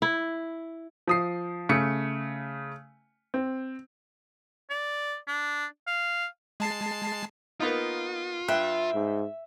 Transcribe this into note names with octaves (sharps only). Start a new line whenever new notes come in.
E4
F3 D#6 C7
C#3 A3 C#7
C4
D5
D4
F5
G#3 A5 C7
A#3 B3 D#4 F4
G2 E5 G5 F#6
G#2